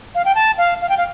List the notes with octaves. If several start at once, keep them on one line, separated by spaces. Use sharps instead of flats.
F5
G5
A5
F5
F5
G5
F5